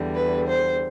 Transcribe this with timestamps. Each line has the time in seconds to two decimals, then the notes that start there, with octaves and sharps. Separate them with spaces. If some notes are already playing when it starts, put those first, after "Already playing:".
Already playing: E2 D3 G3
0.16 B4
0.48 C5